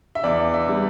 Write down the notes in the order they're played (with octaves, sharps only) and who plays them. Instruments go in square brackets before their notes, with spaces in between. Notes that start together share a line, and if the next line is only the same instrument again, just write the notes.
[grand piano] E5
E2 D5
E5
G3